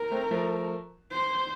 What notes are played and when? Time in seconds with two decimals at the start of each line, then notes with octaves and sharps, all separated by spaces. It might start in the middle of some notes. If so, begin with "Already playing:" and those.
Already playing: A#4
0.11 A3 C4
0.31 F3 A3
1.11 C5